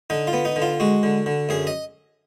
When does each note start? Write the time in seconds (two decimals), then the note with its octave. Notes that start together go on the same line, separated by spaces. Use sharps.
0.10 D3 D#4
0.27 F4
0.33 B3
0.45 D#4
0.56 D3
0.62 F4
0.80 G#3 F#4
1.03 D3
1.26 D3
1.49 F#2 G#4
1.67 D#5